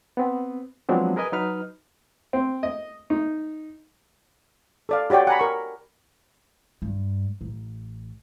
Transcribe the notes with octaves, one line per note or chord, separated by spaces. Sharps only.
B3 C4
F3 F#3 G#3 B3 C4 D4
G#4 A#4 B4 D#5 G#5
F#3 D#4 B4 F6
C4
D#5
D#4
A4 D5 F5
F#4 G4 C#5 D5 G5
F#5 G#5 A#5 B5
A#4 C#6
G2
A1